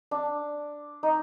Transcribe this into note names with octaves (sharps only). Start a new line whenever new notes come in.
D4
D#4